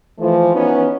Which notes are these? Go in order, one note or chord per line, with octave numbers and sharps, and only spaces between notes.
E3 F3 A3
E3 F3 B3 C#4 D#4 F#4